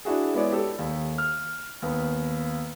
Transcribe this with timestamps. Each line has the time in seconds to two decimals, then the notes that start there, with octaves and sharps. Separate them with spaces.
0.05 D4 E4 F#4 G#4
0.34 G#3 B3 E4 C#5 D5
0.52 G4 A4
0.79 D#2
1.18 F6
1.82 D#2 B3